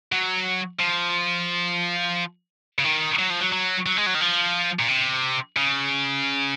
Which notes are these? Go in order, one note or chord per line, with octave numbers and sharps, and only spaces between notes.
F#3
F3
C#3
D#3
F#3
F3
F#3
F#3
F#3
G#3
F#3
D#3
F3
A#2
C3
C#3